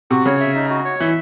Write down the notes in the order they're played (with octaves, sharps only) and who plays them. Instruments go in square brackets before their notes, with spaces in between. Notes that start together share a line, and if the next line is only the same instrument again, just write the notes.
[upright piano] C3 [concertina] F#4
[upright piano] C#3 [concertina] C#5
[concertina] E5
D#4
F#4
C#5
[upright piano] E3 [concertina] E5